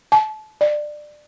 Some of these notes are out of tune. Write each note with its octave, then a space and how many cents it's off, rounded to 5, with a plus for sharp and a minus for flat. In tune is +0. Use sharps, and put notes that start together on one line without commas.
A5 -30
D5 +20